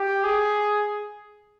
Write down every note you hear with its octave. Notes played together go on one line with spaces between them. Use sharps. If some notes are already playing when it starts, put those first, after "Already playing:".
Already playing: G4
G#4